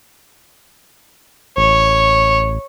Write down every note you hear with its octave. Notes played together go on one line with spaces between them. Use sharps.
A1 C#5